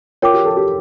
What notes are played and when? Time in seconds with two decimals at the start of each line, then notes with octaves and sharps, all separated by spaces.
0.22 F4 A#4 C#5 G5 D6
0.34 G4
0.45 A4
0.57 G4